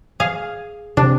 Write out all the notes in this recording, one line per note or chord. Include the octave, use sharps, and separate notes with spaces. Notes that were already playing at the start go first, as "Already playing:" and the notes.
G#4 F5
C3 D4